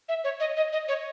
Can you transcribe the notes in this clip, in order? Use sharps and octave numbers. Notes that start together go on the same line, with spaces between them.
E5
C#5
D#5
D#5
D#5
C#5